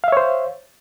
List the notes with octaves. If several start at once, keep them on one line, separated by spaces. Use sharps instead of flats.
C5 C#5 E5 F5